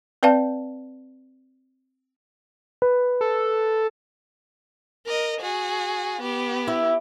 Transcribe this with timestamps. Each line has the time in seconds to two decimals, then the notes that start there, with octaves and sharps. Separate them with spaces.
0.23 C4 B4 D5 F5 A5
2.82 B4
3.21 A4
5.06 A#4 D#5
5.40 F#4 G#4
6.21 B3 G4
6.67 E4